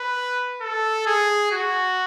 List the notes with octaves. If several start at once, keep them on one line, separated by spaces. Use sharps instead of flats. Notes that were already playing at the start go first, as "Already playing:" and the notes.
Already playing: B4
A4
G#4
F#4